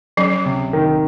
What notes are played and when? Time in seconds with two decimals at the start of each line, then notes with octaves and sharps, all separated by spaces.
0.17 F#3 C#4
0.46 C3
0.73 D#3